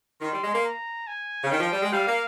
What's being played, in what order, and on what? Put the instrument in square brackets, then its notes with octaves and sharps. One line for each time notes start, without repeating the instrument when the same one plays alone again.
[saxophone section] D#3 [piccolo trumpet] C6
[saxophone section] G3
G#3
A#3
[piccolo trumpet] A#5
G#5
[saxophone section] C#3
[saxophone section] D#3 [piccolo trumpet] G5
[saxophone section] F3
G3
G#3
[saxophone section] G3 [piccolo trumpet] F5
[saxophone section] A#3